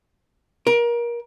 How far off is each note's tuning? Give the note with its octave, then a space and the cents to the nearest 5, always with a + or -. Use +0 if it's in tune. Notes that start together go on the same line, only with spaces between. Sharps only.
A#4 +25